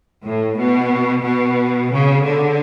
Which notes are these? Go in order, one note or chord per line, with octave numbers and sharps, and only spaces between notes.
A2
B2
B2
C#3
D3